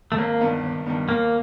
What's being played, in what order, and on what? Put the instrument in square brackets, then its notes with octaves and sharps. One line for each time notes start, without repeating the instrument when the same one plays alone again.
[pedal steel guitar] A3
[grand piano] G#1 [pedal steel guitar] A#3
[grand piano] G2 D#3 G3 B3
G#1
G2 D#3 G3 B3
[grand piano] D#2 [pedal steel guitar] A#3